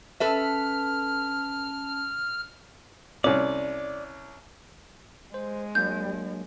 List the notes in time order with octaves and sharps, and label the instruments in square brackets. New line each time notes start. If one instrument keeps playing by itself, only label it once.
[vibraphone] C#4 A5 [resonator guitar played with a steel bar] A4 B4 E5 [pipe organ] F6
[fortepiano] C2 C#4 [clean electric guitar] D5
[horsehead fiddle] G#3 [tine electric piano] C5
[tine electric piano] F#3 A#3 D4 [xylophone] G6